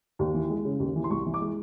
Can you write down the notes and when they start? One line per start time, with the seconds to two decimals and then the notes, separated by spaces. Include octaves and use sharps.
0.19 D#2
0.34 E3
0.50 G#3
0.65 C#3
0.80 D#2
0.96 E3
1.04 C6
1.10 C2 C#6
1.26 E3
1.34 D6
1.41 G#3